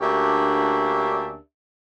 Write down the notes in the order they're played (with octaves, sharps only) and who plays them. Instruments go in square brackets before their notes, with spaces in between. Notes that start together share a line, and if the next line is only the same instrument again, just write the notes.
[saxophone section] D2 A#3 C#4 D4 G4 E5